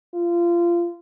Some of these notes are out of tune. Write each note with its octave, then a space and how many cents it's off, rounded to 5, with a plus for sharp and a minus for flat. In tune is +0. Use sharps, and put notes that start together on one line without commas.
F4 -25